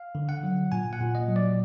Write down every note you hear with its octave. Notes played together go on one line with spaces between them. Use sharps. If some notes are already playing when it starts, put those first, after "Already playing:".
Already playing: F5
D3
F#5
F#3
A#2 G#5
F#5
A#2
D#5
F#3
D5